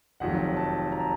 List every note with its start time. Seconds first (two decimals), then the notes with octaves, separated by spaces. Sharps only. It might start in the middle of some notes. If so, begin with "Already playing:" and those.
0.20 F1 F2 D#3 F#3 F#5
0.57 A5
0.92 A#5
1.00 A5